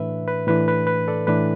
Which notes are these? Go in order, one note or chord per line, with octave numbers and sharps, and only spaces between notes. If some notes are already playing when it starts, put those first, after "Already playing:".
Already playing: A2 E3 D4 B4 E5
B4
A2 E3 D4 B4
B4
B4
A4 D5
A2 E3 D4 B4